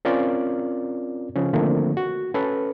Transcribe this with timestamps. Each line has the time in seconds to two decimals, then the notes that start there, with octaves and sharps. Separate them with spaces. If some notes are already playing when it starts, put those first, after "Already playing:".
0.05 C4 C#4 F4 A#4 D5
1.36 C#3 F3 C#4
1.53 D3 D#3 F3 A3 A#3 C4
1.97 F#4
2.34 C#4 A4 B4